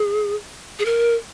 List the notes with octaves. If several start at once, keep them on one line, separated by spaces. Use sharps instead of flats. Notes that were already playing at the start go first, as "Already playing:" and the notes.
Already playing: G#4
G#4
A#4